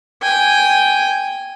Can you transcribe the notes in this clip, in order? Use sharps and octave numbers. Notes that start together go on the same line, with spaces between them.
G5 G#5